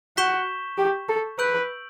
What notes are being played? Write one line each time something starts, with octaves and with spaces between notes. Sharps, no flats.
F#4 C#6 G6 B6 E7 G7
G4
A4
B4 E6 G6 D7 F#7